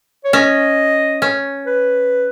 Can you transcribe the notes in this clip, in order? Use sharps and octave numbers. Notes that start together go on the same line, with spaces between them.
C#5
C#4 D#5
C#4
B4